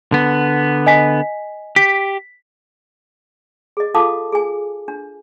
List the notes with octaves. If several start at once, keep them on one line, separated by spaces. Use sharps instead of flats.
D3 B3
D#5 G#5 B6
G4 B6
G#4 D#5
F4 A4 F5 A5 D6 D#6
G#4 G#5
D4